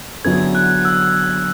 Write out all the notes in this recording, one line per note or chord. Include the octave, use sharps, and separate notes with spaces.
D3 F#3 B3 E4 G#4 G#6
F#6
E6